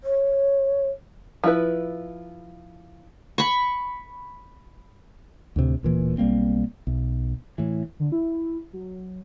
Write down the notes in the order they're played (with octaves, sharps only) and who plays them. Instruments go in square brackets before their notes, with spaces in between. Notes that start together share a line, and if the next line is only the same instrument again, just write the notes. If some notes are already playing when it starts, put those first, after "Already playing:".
[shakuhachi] C#5
[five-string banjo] F3 E4 B4
[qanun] B5 C#6
[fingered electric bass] D2 A2 C3
D1 A#2 E3
B1 G3 A#3 C4
B1
A2 E3
[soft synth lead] D3
E4
F#3